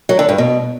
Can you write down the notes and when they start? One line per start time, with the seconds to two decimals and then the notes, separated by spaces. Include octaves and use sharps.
0.09 F#3
0.19 D3
0.29 G2
0.38 B2